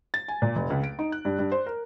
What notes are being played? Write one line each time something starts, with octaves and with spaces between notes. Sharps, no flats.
A6
G#5
A#2
F1
C#2
D7
D#4
F#6
G2
G2
C5
A#4